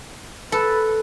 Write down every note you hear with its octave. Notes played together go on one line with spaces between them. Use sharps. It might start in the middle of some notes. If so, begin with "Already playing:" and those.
A4 B4